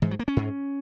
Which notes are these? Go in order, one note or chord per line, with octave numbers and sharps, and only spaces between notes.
G#2 E3
F#3
A#3
C#4
G#2